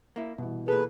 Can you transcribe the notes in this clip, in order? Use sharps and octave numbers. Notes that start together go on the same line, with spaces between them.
A#3 E4
C2 B2 E3
A#2 G#4 A4 B4